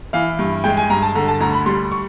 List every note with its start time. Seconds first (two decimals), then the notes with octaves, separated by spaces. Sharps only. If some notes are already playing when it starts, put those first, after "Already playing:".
0.13 E3 F5
0.39 G2
0.64 G#3 G5
0.77 G#5
0.90 G2 A#5
1.02 A5
1.15 D3 A#5
1.28 A5
1.40 D2 A#5
1.53 B5
1.66 G3 C6
1.92 C#6